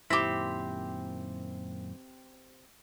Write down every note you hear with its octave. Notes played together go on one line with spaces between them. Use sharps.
F#2 A#2 D#3 C4 E4 G4 D6 B6